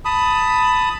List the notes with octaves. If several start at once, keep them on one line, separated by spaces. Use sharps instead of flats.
A5 B5 D#6